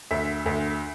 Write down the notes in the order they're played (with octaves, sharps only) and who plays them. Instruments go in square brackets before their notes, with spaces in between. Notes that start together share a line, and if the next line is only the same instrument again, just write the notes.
[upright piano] D2 E5
D2